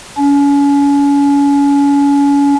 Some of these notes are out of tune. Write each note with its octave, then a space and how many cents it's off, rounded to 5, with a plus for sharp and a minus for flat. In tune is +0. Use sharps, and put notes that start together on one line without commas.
C#4 +35